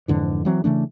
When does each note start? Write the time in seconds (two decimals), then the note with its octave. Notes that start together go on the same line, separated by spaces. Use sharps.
0.08 F2 G#2 D3 E3
0.45 E3 F#3 C4
0.64 C#3 E3 A3 D4